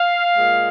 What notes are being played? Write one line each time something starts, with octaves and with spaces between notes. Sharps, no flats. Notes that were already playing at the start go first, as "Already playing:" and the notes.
Already playing: F5
A#2 G#3